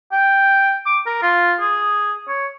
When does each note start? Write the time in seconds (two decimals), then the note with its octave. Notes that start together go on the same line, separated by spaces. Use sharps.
0.12 G5
0.86 D6
1.06 A#4
1.22 F4
1.60 G#4
2.28 C#5